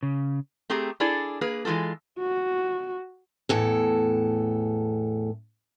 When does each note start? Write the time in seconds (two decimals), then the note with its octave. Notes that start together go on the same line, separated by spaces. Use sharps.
0.03 C#3
0.70 A3 C4 G4 G#4 A#5
1.00 D4 E4 G#4 A4 D5
1.41 A#3 G#4 B4
1.65 E3 G#3 C4 F4 A4
2.19 F#4
3.49 E2 A2 A4